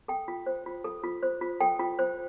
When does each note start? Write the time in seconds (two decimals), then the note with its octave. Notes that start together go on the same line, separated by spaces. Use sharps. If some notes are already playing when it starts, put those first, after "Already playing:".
0.08 A4 G5
0.28 F4
0.46 C5
0.66 F4
0.84 A4
1.04 F4
1.23 C5
1.41 F4
1.61 A4 G5
1.80 F4
1.99 C5